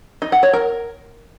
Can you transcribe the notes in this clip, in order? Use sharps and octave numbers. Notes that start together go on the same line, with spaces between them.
D#4
F#5
C#5
A#4